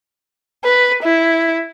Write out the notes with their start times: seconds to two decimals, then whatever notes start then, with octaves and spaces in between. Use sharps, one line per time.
0.64 B4
1.03 E4